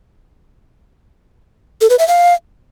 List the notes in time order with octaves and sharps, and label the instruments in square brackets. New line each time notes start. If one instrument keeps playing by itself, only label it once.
[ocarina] A4
B4
E5
F5